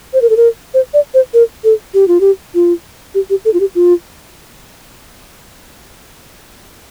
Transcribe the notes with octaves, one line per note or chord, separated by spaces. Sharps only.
C5
A#4
A4
A#4
C5
D5
C5
A#4
A4
G4
F4
G4
F4
G4
G4
A4
F4
G4
F4